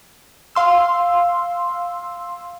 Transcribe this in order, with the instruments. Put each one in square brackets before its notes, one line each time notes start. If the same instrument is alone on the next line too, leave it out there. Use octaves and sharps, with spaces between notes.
[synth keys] F5 C6 E6